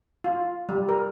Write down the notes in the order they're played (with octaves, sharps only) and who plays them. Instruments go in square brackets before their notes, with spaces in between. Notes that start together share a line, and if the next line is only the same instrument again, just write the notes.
[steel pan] F4
G3
A#4